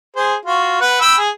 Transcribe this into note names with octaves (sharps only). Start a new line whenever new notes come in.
G#4 C5
F4 F#4
B4 F#5
G5 B5 E6
G#4